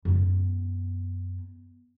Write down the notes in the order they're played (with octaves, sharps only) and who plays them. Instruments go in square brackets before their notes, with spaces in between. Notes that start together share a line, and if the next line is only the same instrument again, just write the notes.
[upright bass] F#2 B3